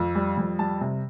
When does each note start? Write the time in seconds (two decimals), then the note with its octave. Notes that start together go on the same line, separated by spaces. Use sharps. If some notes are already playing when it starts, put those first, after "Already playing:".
Already playing: F2
0.15 G3
0.37 F2
0.59 G3 A5
0.81 C3